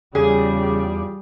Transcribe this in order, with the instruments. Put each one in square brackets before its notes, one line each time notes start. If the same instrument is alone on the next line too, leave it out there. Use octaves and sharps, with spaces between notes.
[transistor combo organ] E2 F4 D5 [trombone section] C#3 [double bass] G3 [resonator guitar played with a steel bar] G#4